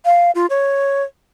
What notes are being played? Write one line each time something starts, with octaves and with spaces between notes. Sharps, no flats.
F5
F4
C#5